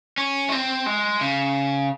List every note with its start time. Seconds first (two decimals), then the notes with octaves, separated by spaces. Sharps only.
0.18 C#4
0.49 A3
0.52 C4
0.86 G#3
1.21 C#3